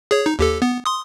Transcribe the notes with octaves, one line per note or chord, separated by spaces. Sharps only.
G#4 C#5
D#4
D#2 G4 A4
B3
C6 D#6